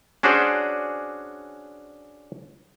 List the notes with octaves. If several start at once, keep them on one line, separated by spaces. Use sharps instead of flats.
C#4 D4 F#4 G#4 C5 D5